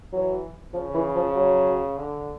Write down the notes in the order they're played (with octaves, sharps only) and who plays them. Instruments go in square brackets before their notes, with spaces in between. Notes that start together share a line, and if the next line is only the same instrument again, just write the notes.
[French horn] E3 [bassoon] F#3
[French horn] C#3 [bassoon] F3
[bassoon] E3
F3
F#3
[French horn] D3